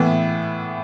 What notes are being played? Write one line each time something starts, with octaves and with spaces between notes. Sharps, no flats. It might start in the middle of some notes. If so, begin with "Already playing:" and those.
Already playing: A2 E3 B3